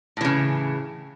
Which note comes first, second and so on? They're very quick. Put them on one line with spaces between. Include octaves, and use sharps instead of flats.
A2 E3 C#3